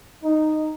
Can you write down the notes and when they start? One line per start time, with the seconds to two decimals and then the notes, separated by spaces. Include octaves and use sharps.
0.23 D#4